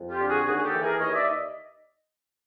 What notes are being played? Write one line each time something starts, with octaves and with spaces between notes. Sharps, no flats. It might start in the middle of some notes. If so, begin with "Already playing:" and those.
Already playing: F2
F4 G4
D3
F#4 G#4
D#2 F#4 G#4
G#4
G4 A4
E3
G#4 A#4
D#2 C#5 D#5
D5 E5
D#5